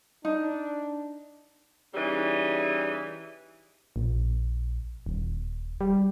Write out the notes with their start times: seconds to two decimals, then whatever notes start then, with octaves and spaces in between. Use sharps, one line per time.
0.25 D4 D#4
1.94 C#3 E3 G3 D#4
3.96 A#1
5.06 D#1
5.81 G3